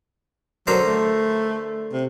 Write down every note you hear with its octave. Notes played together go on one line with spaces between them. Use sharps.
D3 F#3 A#4 C5
A3
C3